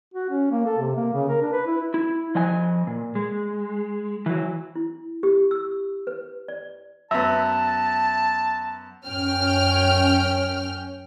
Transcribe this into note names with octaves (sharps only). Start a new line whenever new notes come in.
F#4
C#4
A#3
A4
C3
A#3
C#3
A#4
D4
B4
E4
E4
F3 D#5 G#5
A#2
G#3
E3 F#3
E4
G4
E6
B4
D5
F#2 B3 E5 A5
F#2 C#4 G5 F6